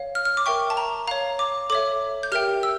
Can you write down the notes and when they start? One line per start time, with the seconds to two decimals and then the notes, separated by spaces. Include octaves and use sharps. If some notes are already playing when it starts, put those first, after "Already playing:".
Already playing: C#5 F5
0.15 F6
0.25 F6
0.37 D6
0.46 A#4 E5 G5 C#6
0.70 A5
0.77 A#5
1.07 C#5 F5 A#5
1.39 D6
1.70 A4 C#5 E5 D6
2.23 G6
2.32 G4 A#4 E5 G5 F6
2.63 E6